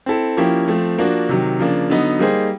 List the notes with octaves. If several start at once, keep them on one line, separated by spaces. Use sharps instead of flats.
C4 E4 A4
F3 A#3 C#4 E4 G4
F3 A3 C4
F3 A#3 D4 F#4
C3 D#3 F#3
C#3 F3 A#3 D4
D3 F#3 B3 D#4
G3 A#3 D#4 G#4 C5